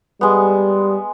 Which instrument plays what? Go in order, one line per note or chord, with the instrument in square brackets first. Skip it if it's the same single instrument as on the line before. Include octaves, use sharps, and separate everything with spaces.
[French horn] G3 [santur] G#3 B3